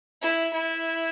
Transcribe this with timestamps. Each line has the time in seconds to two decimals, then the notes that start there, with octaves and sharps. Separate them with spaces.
0.22 E4
0.53 E4